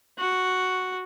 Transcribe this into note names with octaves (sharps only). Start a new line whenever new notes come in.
F#4